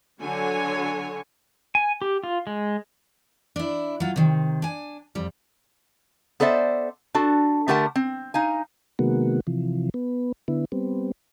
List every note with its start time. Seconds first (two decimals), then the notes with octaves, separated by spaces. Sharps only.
0.21 D3 F#3 C#5 G#5
1.75 G#5
2.02 G4
2.24 F4
2.47 G#3
3.56 D4 E4
4.00 F#3 F4
4.16 C3 D#3
4.62 D4 G#5
5.15 F2 G3
6.40 B3 A4 C5 D5 E5
7.15 D4 F#4 A4
7.68 D3 A3 G4 A#4 F#5 A5
7.95 C4
8.34 D#4 F5 G#5
8.99 C3 D#3 G#3 A#3 B3 F#4
9.47 C3 E3 F3
9.94 B3
10.48 D3 B3 E4
10.72 G3 B3 C4